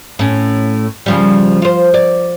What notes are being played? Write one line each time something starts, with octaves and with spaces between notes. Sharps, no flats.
A2 C#4
C#3 F3 G3
F4 C5
D5